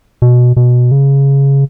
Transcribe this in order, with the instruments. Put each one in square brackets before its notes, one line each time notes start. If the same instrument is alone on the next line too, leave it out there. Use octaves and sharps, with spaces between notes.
[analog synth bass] B2
B2
C#3